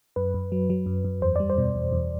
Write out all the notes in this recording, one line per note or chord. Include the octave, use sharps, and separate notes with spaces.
F#2 B4
F#2
F#3
F#3
F#2
F#2
E2 C5
G3 D5
C5
B2
E2
E2